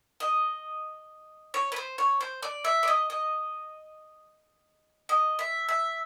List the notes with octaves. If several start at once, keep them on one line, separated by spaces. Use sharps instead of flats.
D#5
C#5
B4
C5
C#5
C5
D5
E5
D5
D#5
D#5
D#5
E5
E5